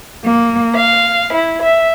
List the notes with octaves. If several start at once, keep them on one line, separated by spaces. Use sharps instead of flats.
A#3
F5
E4
E5